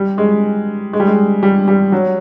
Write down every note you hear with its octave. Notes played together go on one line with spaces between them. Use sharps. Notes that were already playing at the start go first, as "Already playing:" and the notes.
Already playing: G3
G#3
G#3
G3
G#3
G3
G3
F#3